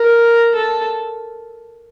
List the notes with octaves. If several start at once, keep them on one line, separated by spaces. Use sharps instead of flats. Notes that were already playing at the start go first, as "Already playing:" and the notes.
Already playing: A#4
A4